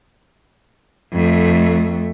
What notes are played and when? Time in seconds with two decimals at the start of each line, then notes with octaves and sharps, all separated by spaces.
1.13 F2 A3